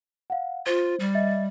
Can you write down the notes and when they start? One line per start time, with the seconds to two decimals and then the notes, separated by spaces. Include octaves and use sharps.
0.30 F5 F#5
0.67 F4 C5
1.00 G3
1.15 D#5 E5 A6